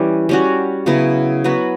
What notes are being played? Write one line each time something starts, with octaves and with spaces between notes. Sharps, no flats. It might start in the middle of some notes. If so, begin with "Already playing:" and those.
Already playing: E3 G3 C#4
G3 C#4 F#4
C#3 F#3 B3 E4
F#3 B3 F#4 B4